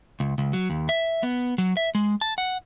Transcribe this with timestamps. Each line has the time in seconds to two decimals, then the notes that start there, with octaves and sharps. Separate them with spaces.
0.20 C#2
0.38 C#2
0.53 F#3
0.70 D#2
0.89 E5
1.23 B3
1.58 F#3
1.77 E5
1.95 G#3
2.21 A5
2.38 F#5